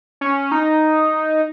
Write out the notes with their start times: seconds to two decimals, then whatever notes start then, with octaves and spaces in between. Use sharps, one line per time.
0.21 C#4
0.52 D#4